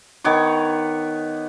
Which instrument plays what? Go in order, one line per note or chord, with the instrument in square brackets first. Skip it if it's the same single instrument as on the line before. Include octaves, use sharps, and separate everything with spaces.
[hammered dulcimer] D#3 B3 C#5 D6